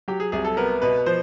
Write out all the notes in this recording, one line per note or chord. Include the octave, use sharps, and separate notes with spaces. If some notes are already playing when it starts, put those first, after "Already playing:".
F#3 G4
G#4
C2 G#4
A4
B3 A#4
B2 B4
F3 C5